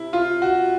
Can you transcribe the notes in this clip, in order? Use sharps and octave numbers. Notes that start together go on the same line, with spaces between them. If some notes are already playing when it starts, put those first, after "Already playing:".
Already playing: C3 E4
F4
F#4